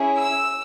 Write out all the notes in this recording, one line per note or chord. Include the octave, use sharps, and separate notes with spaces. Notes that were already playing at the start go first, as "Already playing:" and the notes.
Already playing: C#4 E4 G#4
E6